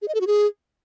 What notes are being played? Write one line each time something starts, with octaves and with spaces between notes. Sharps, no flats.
G#4
D#5
A4
F#4
G#4